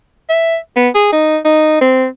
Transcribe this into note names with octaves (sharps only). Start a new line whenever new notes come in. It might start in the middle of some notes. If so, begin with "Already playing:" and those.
E5
B3
G#4
D#4
D#4
C4